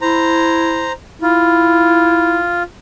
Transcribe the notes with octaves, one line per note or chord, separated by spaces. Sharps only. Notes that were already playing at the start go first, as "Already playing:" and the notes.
E4 C5 A#5
E4 F4